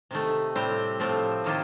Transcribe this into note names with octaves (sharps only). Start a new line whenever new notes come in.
C3 D#3 A3
A2 G3 C4 G4
A2 F3 A3 C4 G4
C3 D#3 A#3 F4